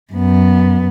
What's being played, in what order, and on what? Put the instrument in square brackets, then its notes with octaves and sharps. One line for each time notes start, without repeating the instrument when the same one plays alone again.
[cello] F#2 B3